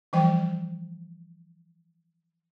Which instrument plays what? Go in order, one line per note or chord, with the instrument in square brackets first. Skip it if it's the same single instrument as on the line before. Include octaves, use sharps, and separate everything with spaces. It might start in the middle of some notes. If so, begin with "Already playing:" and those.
[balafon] E3 F3 G3 G5